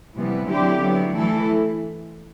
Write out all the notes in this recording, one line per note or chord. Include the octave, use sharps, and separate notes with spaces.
C3 E3 G3 B3
D3 F#3 C4 E4 G4
F#3 B3 E4
E3 A3 E4 A4